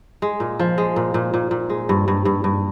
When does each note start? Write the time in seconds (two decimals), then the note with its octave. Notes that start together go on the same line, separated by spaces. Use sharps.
0.22 G#3
0.40 A#2
0.60 F3
0.78 G#3
0.96 A#2
1.14 A#2
1.34 A#2
1.51 A#2
1.70 G#3
1.89 G2
2.08 G2
2.25 G2
2.44 G2